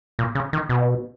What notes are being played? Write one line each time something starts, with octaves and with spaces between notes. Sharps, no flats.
A#2
C#3
D#3
B2